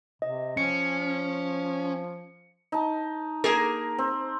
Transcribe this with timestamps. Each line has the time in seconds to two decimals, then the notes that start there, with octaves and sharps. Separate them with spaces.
0.22 C3 D#5
0.57 F3 C#4 C#7
2.72 D#4 A5
3.44 A#3 G#4 A#4
3.98 C4